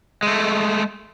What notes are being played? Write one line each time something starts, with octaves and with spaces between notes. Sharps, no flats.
G#3 A3